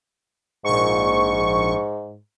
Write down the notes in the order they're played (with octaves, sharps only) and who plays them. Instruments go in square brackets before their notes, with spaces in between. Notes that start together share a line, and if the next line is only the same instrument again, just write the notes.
[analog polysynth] A#1 C#6 [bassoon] G#2